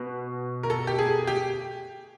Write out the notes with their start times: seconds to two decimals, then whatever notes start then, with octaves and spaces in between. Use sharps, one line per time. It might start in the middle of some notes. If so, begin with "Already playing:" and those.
Already playing: B2
0.63 A#4
0.70 A4
0.87 G4
0.98 G#4
1.27 G4